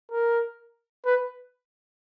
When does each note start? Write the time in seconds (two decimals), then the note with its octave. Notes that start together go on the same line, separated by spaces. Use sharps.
0.11 A#4
1.06 B4